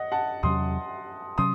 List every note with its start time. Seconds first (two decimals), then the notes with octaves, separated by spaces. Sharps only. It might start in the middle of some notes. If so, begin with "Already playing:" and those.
Already playing: D#5 F#5
0.12 F#5 A5
0.43 E2 C3 F#3 C#4 C6 D#6
1.38 C3 F#3 C#4 C6 D#6